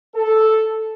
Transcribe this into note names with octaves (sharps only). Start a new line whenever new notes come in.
A4